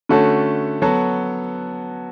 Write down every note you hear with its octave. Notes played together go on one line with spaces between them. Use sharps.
D3 A3 C#4 F#4 A4
F#3 B3 F#4 A4